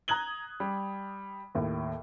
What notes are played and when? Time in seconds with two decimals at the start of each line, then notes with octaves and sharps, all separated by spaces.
0.08 A#5 D#6 F#6 G#6 F#7 G7
0.60 G3
1.55 D#2 A2